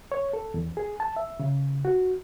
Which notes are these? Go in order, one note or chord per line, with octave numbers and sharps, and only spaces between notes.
C#5
A4
E2
G#4
A5
E5
C#3
F#4